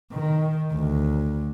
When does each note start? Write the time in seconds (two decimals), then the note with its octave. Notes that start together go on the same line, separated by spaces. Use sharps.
0.13 D#3
0.72 D2